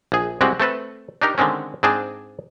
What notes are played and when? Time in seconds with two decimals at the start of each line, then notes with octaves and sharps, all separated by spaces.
0.12 A#1 G#4
0.41 C2 G#3 C4 F#4 G4 F#5
0.60 A3 C4 A4 B4
1.22 D4 D#4 G4 A#4
1.38 D3 D#3 G#3 C4 C#4
1.83 G#2 C4 D4 G#4 G5 A5